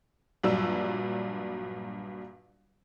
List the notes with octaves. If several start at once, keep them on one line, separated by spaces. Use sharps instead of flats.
A#1 G2 F#3 D5 E6